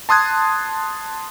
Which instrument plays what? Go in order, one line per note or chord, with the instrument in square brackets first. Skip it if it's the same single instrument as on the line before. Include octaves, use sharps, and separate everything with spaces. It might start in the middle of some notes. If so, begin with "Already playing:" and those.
[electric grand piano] A5 C6 D#6 F#6 G#6